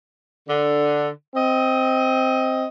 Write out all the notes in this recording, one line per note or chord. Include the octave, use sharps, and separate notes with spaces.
D3
C4 D#5